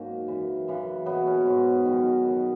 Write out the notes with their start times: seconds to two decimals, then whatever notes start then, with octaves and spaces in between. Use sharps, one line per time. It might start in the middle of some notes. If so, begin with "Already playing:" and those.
Already playing: G#2 F#3 A#3 C#4 D#4
0.28 F#2 E3
0.68 F#2 C#3 E3
1.06 B2 F#3 B3
1.27 C#4
1.46 G#2 F#3
1.85 F#2 D#3 F#3
2.25 B2 F#3